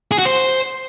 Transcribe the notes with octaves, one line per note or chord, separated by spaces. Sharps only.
G#4
F#4
C5